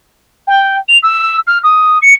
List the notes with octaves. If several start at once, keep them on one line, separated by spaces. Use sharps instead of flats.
G5
F7
E6
F6
D#6
C#7